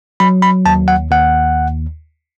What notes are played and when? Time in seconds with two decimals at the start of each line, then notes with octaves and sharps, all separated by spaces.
0.20 F#3 B5
0.42 B5
0.66 D#2 A5
0.88 F#5
1.11 D#2 F#5